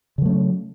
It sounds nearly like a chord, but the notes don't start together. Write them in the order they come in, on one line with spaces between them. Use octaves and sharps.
C#3 F#3 A3 C#4